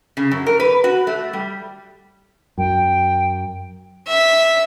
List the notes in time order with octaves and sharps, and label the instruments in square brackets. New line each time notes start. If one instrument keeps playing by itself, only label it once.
[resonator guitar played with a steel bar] C#3
F#2
A#4
B4
F#4
A3
G3
[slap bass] F#2 [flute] G5
[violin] E5